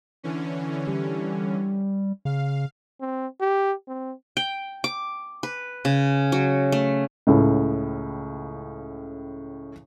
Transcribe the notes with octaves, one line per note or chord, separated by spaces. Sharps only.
D3 E3 C#4
G3
C#3 F5
C4
G4
C4
G5
D6
B4
C#3
F#3
A3
C#2 A2 C#3